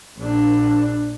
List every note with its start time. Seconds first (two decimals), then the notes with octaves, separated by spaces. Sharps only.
0.18 A#1 D4